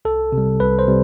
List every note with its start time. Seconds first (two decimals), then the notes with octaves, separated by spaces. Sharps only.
0.05 C2 A4
0.32 C3
0.38 G3
0.60 C2 B4
0.79 C5
0.87 C3 G3